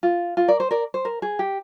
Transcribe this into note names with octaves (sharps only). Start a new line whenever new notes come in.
F4
F4
A#4 D5
C5
A#4 D5
C5
A#4
G#4
G4